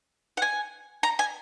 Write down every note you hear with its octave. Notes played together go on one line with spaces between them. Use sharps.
F#5
G#5
A#5
G#5